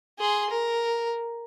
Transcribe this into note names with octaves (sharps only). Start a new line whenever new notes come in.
G#4 C6
A#4